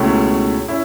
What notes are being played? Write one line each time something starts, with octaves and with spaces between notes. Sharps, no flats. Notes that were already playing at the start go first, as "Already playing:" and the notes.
Already playing: C#2 B2 A3 C#4 E4
C#4 E4